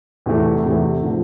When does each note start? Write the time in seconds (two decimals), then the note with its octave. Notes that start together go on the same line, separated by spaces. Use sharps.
0.26 E2 C3 E3 A3
0.63 E2 C3 E3 A3
1.03 D3 F3 A3